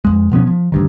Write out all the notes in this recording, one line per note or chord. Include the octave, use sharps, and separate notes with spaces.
F2 G#3
B2 F3 B3 C#4
F3
D2 G2 D#3